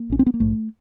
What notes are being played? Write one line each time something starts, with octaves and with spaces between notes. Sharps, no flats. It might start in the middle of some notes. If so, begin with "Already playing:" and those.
Already playing: A#3
A#1 A#2 C#4
C4
B3
A#3
A#1 G#2 A3